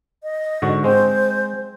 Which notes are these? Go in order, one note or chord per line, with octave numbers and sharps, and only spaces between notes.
D#5
G#2 D3 F#4
G#3 C4 C5